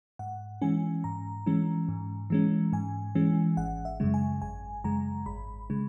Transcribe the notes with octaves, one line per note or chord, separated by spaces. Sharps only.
G#2 F#5
E3 G#3 C#4 G#5
G#2 A#5
E3 G#3 C#4
G#2
E3 G#3 C#4
G#2 G#5
E3 G#3 C#4
G#1 F#5
E5
F#2 C#3 G#3
G#5
G#1 G#5
F#2 C#3 G#3 A#5
G#1 B5
C#3 G#3